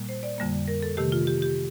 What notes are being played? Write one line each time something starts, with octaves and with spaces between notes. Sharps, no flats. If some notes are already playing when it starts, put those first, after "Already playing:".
Already playing: A#2 G3 A#3
C5
D5
F2 D3 G3 A#3
A#4
A4
C3 D#3 A3 G4
F4
G4
G4